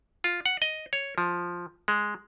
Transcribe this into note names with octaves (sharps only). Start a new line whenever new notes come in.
F4
F#5
D#5
C#5
F3
G#3